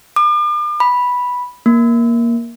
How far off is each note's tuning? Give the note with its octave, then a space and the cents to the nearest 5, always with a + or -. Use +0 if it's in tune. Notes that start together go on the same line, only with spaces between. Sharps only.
D6 +40
B5 -5
A#3 +10